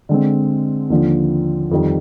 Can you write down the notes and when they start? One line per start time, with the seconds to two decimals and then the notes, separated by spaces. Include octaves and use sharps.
0.09 D3 G#3 C4
0.90 D#2 D3 F3
1.71 F2 D#3 G3